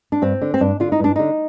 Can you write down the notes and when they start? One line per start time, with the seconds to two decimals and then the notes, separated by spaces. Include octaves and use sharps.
0.12 D4
0.22 G2 C4
0.42 D3
0.54 C4
0.60 G2 D4
0.80 D3 F4
0.92 D#4
0.99 G2 D4
1.16 D3 D#4